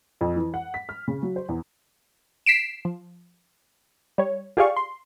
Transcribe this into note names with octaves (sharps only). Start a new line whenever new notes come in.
F2
E3
F#5
B6
F6
C#3
F#3
C5
E2
B6 C7 D7 E7
F3
G3 C#5
F4 G4 G#4 D5 F5 C#6
C6